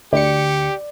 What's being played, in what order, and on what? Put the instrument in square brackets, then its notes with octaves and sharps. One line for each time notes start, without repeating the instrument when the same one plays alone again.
[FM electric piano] D2 C#7 [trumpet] G4 [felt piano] D5